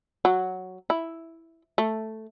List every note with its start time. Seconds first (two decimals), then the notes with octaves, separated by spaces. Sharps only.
0.25 F#3
0.90 E4
1.78 A3